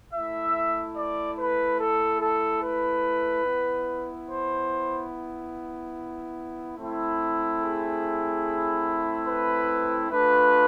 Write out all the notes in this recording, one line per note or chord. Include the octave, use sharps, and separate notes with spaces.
A3 E4 E5
D5
B4
A4
A4
B4
B3 E4
C5
A3 C4 E4
G#4
B4
A3 D4 F4 B4